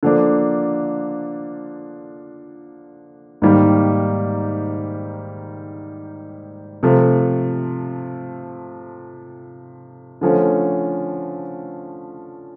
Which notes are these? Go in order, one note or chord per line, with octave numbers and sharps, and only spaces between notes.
D3 F3 A#3 D4
G#2 D#3 G3 A#3 D#4
C3 F3 A3
D3 F3 A3 C#4